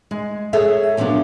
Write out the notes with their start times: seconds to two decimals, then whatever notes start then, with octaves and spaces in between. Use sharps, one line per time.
0.11 G#3
0.53 G#4 A4 C#5 E5
0.97 A#2 F3 F#3 B3 D4